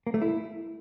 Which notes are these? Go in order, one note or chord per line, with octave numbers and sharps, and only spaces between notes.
A#3
A3
E4